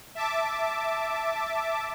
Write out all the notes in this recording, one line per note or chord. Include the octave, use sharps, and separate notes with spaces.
E5 A5 D6